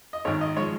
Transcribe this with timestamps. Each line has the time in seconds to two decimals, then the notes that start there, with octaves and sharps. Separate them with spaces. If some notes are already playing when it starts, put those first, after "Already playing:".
0.13 D#5
0.25 G#1 G#2 D#3 G#3 C#5
0.41 D#5
0.56 F3 G#3 C#5